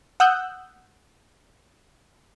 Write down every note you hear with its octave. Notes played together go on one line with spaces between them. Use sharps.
F#5 D#6 E6 F#6 G6